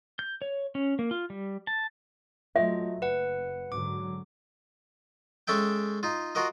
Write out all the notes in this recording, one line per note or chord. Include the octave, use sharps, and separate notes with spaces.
G6
C#5
C#4
A#3
F4
G3
A5
F#3 A3 F4 D#5 E5
F#1 B4 F#5
G#2 D3 F#3 D6
G#3 C#4 A4 E5 G5
D#4 F4
F4 F#4 A#4 D#5